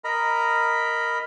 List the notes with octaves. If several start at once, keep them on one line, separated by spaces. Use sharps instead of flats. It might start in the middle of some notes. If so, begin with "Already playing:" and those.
A#4 D#5 A#5 B5